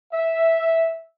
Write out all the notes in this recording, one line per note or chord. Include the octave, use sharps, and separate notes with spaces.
E5